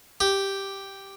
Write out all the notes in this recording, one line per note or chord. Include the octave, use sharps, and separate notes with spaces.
G4